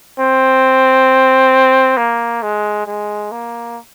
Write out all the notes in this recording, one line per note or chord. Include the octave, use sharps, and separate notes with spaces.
C4
A#3
G#3
G#3
A#3